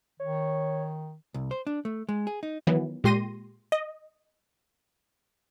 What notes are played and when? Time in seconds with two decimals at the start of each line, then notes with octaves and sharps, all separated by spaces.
0.20 D#3 C#5
1.34 C2
1.51 C5
1.67 D4
1.85 A3
2.09 G#3
2.27 G#4
2.43 D#4
2.67 D#3 E3 F#3 B3
3.04 A#2 G#3 G4 C6 A#6 D#7
3.72 D#5